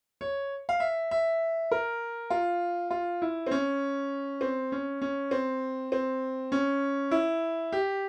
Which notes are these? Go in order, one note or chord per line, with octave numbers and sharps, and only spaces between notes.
C#5
F5
E5
E5
A#4
F4
F4
E4
C4
C#4
C4
C#4
C#4
C4
C4
C#4
E4
G4